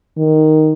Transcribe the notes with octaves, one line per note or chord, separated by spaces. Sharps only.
D#3